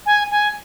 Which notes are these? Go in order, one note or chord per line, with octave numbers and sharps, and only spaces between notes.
G#5
G#5